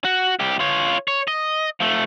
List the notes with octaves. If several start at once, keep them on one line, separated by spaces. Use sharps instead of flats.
F#4
C2 G4
F4 C#5
C#5
D#5
F3 A3